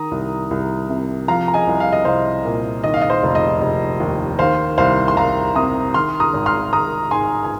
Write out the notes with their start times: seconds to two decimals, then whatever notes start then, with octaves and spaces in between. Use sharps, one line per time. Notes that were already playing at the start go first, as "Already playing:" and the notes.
Already playing: D#3 A#5 D#6
0.11 C2
0.51 C2
0.90 C3
1.28 F3 F5 A#5
1.48 A#5
1.54 D#5 G#5
1.67 C2
1.80 F5
1.93 D#5
2.05 C2 C5 F5
2.45 A#2
2.84 D#3 D#5
2.94 F5
3.01 D#5
3.10 C5
3.23 F1
3.35 D#5
3.62 F1
4.00 D#2
4.39 D#3 C5 F5
4.78 C2 C5 F5
5.08 C6
5.17 C2 F5 A#5
5.55 C3 A#5 D#6
5.94 D#3 C6 F6
6.20 A#5 D#6
6.33 G#1
6.46 C6 F6
6.73 G#1 A#5 D#6
7.11 G#2 G#5 C6
7.45 G#5